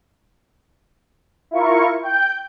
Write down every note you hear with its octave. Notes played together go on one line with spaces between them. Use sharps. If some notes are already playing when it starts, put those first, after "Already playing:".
E4 F4 A#4 C#6
G5 G6